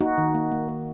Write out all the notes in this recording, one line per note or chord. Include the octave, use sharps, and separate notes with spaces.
A#3 D#4 F#4
D#3
A#3
A#3
A#3